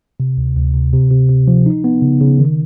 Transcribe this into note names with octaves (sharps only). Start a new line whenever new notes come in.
C3
D2
D2
C3
C3
C3
C3
F3
D#4
B3
C#3
C#3
D#3